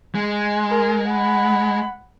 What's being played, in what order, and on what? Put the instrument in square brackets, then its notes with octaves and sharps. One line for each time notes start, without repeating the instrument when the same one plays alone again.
[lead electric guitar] G#3
[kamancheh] A#4
F#5 B5